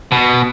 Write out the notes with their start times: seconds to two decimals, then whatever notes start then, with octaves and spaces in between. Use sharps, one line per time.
0.12 B2